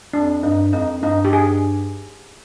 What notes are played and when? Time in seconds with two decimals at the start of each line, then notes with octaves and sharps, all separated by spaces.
0.13 F2 D4
0.43 G2 D#4
0.73 F2 D#4
1.02 G2 D#4
1.25 G4
1.33 G#4